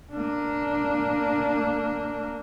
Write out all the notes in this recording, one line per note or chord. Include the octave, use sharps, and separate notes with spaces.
A#3 D4